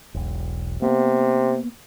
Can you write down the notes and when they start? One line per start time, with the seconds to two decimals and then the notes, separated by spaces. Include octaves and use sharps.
0.14 E1 B1
0.82 C3 A#3 B3